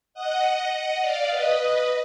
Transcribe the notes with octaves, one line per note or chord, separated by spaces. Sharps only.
D#5 F#5
D#5 F#5
D5 F5
B4 D#5
B4 D#5